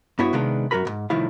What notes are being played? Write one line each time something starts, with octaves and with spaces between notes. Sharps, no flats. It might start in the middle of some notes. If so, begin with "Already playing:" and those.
G2 B3 E4 F#4 C#5
C3 D#3 G#3 B3 D4 F5
F#2 C#3 F#4 A#4 B5
C#2 G#2
C2 A2 D#3 F3 E4 F5